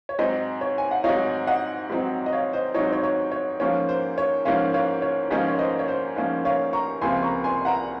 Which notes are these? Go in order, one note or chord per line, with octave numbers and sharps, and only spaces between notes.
C#5
G#2 F#3 C4 D#4 C5 D#5
C#5
G#5
F#5
G#2 F#3 C4 D#4 C#5 F5
D#5 F#5
G#2 F#3 C4 D#4
D#5
C#5 F5
C5 D#5
G#2 F#3 C4 D#4 C#5
C5
C#5
C#5
C#5
G#2 F3 A#3 C#4 C#5
C5
C#5
G#2 F3 A#3 C#4 C#5 F5
C#5 F5
C#5
G#2 F3 A#3 C#4 C5 D#5
C#5
C5 D#5
C#5
C5
G#2 F3 A#3 C#4
C#5 F5
A#5 C#6
C#2 C3 F3 A#3 G#5 C6
A#5 C#6
G#5 C6
F#5 A#5